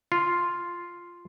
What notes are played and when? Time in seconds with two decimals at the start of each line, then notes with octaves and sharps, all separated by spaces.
0.12 F4